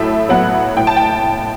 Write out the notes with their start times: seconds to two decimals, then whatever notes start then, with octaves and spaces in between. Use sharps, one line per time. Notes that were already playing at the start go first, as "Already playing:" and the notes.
Already playing: A2 F#3 A4 E5
0.29 F#3 B3 F#5
0.76 A2 G5
0.87 A5
0.97 G5